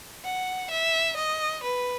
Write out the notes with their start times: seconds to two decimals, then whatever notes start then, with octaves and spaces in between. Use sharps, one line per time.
0.24 F#5
0.71 E5
1.17 D#5
1.63 B4